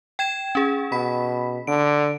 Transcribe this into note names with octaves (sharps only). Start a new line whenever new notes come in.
G5 G#6 E7
C#4 G#4
B2 B5 B6
D3 D7